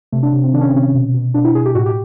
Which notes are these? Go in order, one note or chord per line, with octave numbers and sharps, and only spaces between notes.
C3 A3
D4
C3
C4
D#3 D4
C#4
C4
C3 C#4
B2
B2
B2 D4
E4
B2 G#4
G4
A2 F#4
G4